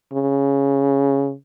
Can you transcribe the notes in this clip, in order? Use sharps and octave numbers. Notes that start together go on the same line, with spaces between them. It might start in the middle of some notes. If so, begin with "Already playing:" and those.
C#3